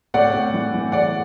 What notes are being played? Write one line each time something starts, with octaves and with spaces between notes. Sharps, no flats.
A2 D5 F#5
A2
E3
E3
A2 D5 F#5